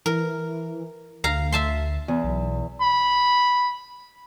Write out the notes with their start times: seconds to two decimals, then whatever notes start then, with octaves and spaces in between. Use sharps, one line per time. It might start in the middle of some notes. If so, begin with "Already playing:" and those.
0.06 E3 A#4
1.24 D2 F5 A#5
1.52 E5 A5 C6
2.08 E2
2.24 B1
2.81 B5